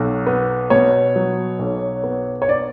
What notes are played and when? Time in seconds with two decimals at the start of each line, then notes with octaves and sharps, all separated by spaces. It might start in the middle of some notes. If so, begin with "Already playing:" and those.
Already playing: B1 F#3
0.26 B3
0.70 B2 C#5
1.16 F#3
1.59 B1
2.04 B3
2.42 C#5
2.49 D5